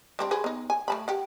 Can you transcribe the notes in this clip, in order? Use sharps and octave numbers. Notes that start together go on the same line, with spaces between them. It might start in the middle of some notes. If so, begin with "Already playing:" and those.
G3 C4 D4
G#4 B4 C5
B3 D#4
G#5
A3 A5 B5
G4 F#5